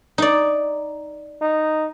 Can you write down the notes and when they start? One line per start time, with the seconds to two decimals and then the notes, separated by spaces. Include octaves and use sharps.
0.18 D#4 D5
1.41 D#4